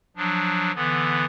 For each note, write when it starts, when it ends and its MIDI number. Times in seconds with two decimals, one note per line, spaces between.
0.17 0.72 53
0.17 0.72 54
0.17 0.72 62
0.75 1.25 50
0.75 1.25 52
0.75 1.25 59